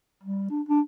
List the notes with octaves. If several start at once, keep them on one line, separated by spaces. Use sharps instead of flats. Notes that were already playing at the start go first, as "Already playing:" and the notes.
G3
D4
D4